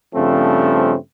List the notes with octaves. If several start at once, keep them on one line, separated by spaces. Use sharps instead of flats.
G2 C#3 F3 A3 C4